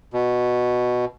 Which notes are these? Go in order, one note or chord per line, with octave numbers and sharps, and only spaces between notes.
B2